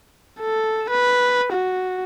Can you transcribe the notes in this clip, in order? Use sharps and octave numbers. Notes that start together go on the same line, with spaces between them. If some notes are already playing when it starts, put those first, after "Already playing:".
A4
B4
F#4